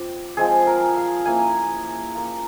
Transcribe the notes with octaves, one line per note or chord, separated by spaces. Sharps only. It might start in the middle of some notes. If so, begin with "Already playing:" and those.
Already playing: F3 C4 F4 G4
F3 G#3 C4 G#4
A#4
F5
F3 A#3 C#4 E4 G#5
A#3 F4